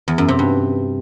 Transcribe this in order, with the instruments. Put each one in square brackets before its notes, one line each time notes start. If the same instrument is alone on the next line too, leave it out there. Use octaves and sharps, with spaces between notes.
[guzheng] E2
F#2
C3
G2